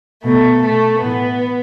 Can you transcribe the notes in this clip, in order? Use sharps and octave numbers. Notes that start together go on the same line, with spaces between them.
B2 A3
B2 A3
A2 E3 B3